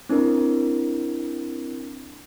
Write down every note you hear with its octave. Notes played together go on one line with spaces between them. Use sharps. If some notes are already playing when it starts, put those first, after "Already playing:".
C4 D4 E4 A#4